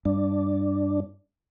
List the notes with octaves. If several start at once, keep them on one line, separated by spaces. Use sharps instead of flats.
G2 D4